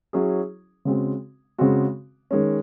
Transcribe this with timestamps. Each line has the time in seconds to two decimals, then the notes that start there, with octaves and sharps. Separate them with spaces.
0.13 F#3 C#4 E4 G#4
0.85 C#3 G#3 C4 F#4
1.58 C#3 G#3 C4 F#4
2.31 D#3 G#3 C#4